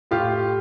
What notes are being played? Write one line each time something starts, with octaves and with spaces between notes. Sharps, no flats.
A2 F4 G4